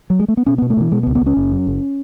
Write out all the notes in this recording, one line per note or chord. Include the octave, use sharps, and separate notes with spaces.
F#3
G#3
A3
B3
B2 C#4
B2 B3
A3
B2 E3
B2 G#3
B3
C#2
B3
C#2 C#4
F#1
F#2
F#1